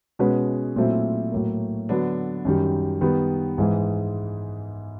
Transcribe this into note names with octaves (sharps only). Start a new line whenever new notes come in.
B2 G#3 C#4 F#4 B4
A#2 F#3 A3 C4 E4
A2 F#3 A#3
D3 F#3 B3 D4
F#2 D#3 G3
D#3 G3 B3
G#2 E3 G#3